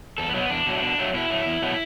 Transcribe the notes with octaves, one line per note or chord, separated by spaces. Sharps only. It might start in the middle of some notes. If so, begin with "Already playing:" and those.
E2 A4
B3
B2 F#3 A3
B3
E2 D4
B2 F#3 A3
B2
F#3 A3
B2 E4
F#3 A3
E2
B2 F#3 A3